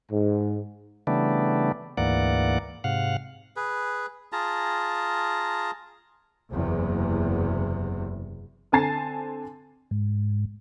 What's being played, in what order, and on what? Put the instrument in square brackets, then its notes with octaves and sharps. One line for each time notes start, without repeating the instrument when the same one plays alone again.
[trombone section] G#2
[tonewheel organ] C#3 E3 G3 A3 B3 D4
D2 G#2 E3 A#3 D5 F#5
G#2 C3 F5 F#5
[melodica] G#4 B4
F4 G#4 A5 A#5
[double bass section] F#1 E2 C3
[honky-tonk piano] D3 C4 G#5 A5 A6 C7
[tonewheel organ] G#2